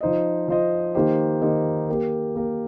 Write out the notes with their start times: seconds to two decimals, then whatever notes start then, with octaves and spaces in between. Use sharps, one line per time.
0.01 F3 D#4 C5 D#5
0.48 F3 D#4 C5 D#5
0.95 D#3 A#3 D#4 G4 C5
1.41 D#3 A#3 D#4 G4 C5
1.88 A#3 G4 A#4
2.35 A#3 G4 A#4